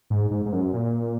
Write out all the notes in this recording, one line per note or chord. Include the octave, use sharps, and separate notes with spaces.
G#2
G#2
G#2
F#2
A#2